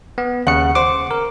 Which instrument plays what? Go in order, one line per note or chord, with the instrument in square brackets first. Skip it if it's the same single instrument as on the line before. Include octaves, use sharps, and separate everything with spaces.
[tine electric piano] B3
[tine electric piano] D#2 C#3 C#7 [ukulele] F#5
[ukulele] C5 [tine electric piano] D6
[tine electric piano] A#4